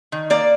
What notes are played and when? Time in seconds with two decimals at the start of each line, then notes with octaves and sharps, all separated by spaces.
0.12 D#3
0.30 A#3 D5